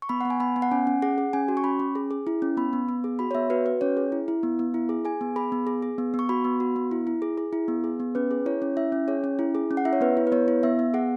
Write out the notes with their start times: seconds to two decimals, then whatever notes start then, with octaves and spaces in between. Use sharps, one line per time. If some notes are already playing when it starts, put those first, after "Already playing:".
0.02 C#6
0.09 B3 B5
0.21 B3 F#5
0.30 G#5
0.40 B3 B5
0.56 B3
0.62 F#5
0.71 C#4 G#5
0.87 C#4
1.02 G#4 F#5
1.18 G#4
1.33 C#4 G#5
1.48 F#4
1.57 C#6
1.64 C#4 B5
1.80 C#4
1.95 G#4
2.11 G#4
2.27 E4
2.42 C#4
2.57 B3 B5
2.73 B3
2.89 B3
3.04 G#4
3.19 F#4 B5
3.31 C#5
3.35 B3 E5
3.50 F#4 B4
3.66 F#4 B4
3.81 C#4 C#5
3.97 G#4
4.12 E4
4.28 E4
4.43 B3
4.59 B3
4.74 E4
4.89 G#4
5.05 G#4 G#5
5.21 B3
5.36 G#4 B5
5.52 B3
5.67 G#4
5.82 G#4
5.98 B3
6.14 B3
6.19 C#6
6.29 F#4 B5
6.44 B3
6.60 F#4
6.76 B3
6.91 E4
7.07 E4
7.22 G#4
7.38 G#4
7.53 E4
7.68 B3
7.84 G#4
8.00 B3
8.15 C#4 B4
8.31 G#4
8.46 E4 C#5
8.62 C#4
8.77 E4 E5
8.92 C#4
9.08 G#4 C#5
9.24 C#4
9.39 E4
9.55 G#4
9.71 C#4
9.77 F#5
9.85 E4 E5
9.93 C#5
10.01 B3 B4
10.17 E4
10.27 B4
10.32 B3 C#5
10.48 E4
10.63 B3 E5
10.79 B3
10.94 G#4 F#5